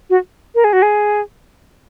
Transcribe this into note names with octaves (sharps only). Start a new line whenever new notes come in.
F#4
A#4
G#4
F#4
G#4